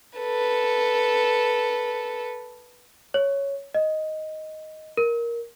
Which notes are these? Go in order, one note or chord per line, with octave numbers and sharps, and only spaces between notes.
A4 B4
C#5
D#5
A#4